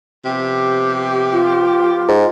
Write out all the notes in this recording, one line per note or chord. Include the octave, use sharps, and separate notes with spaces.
C3 F3 B3 G4
F4
G#2